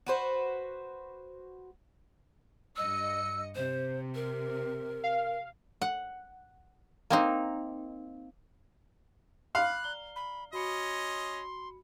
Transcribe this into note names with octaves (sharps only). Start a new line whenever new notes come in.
F#4 B4 C5
G2 D#5 E6 C#7
C3 C5
A#4
F5
F#5
A#3 C4 D#4
F5 B5 D6 F#6 F#7
D5 A#5 G7
B5
C#4 F#4 D#5 B5 C6 C#7